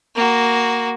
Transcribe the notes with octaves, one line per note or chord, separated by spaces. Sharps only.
A#3 F#4